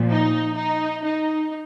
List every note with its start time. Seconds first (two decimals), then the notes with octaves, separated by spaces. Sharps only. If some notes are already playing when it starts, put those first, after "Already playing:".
Already playing: A#2 F3
0.10 D#4
0.57 D#4
1.04 D#4